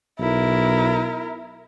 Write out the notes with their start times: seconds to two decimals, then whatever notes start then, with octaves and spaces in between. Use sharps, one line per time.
0.20 B1 E4 A#4